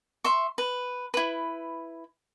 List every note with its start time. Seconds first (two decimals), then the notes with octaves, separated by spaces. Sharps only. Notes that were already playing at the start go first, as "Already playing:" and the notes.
0.24 E5 C6 C#6
0.58 B4
1.14 E4 B4